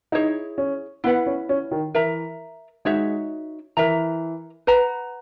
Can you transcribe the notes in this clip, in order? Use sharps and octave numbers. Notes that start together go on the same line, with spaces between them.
D#4 E4 G#4 C#5
C#4
B3 E4 B4 F#5
C#4
C#4
D#3
E3 A#4 E5 A#5
G#3 D#4 F#4 C#5 E5
E3 A#4 E5 A#5
B4 F#5 A#5